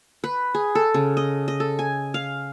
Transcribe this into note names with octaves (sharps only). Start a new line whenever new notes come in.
B4
G#4
A4
C#3
D#5
D#5
A4
G#5
F5